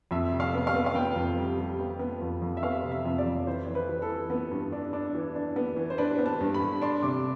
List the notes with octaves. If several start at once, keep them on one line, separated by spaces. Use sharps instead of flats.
F2 E5
C3
F5
B3
F5
B3
F5
B3 G5
F2
G3
G3
B3
B3
F2
F2
E5
B3 F5
C3
E5
F2
D5
F2
E3 C5
E3
B4
E3
A4
E3
B3
G2
D4
D4
E3
D4
B3
E3
C5
D4 B4
B3
A5
G2
B5
G2
D4 C6
C3 D6